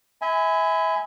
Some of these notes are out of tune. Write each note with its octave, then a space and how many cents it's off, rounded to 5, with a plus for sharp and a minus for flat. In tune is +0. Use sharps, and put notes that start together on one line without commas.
E5 -30 G#5 +0 B5 +25